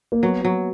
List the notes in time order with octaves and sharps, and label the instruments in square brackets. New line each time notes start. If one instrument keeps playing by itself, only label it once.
[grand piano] A#3
[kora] F#3 [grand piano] B3
[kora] F#3